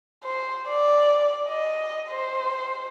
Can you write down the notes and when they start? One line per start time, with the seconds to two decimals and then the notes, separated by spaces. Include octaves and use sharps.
0.24 C5
0.69 D5
1.49 D#5
2.10 C5